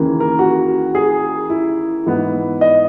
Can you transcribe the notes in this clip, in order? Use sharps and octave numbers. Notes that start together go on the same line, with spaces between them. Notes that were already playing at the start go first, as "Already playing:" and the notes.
Already playing: D#2 C#3 E3 A#3
A#4
F#4
G#4
E4
G#2 E3 B3
D#5